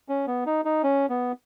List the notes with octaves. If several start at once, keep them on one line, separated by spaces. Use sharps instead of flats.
C#4
B3
D#4
D#4
C#4
B3